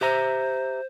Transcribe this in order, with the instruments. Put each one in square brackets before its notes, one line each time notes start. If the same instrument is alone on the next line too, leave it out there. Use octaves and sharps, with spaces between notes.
[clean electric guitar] G4 E5 A#5 [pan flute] C5